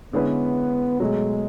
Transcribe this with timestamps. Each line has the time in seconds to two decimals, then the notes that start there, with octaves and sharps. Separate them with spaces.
0.13 D3 G#3 B3 C#4 E4 B4
1.00 B2 F#3 G#3 A3